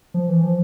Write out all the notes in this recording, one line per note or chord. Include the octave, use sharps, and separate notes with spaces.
F3
E3
F3